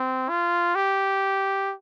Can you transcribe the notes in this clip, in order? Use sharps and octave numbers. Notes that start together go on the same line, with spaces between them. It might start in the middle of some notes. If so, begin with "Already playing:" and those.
Already playing: C4
F4
G4